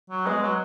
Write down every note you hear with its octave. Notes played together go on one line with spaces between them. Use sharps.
F#3
G#3 B3 G#4 B4 D#5
F#3